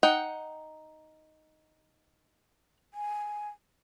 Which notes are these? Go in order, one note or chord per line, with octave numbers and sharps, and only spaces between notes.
D#4 F#5 G5
G#5